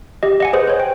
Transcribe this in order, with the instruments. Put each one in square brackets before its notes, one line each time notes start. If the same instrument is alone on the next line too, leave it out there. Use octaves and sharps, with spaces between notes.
[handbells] G4 D#5
D#5 F#5 G#5
G#4 B4 C5
C5 C#5
G5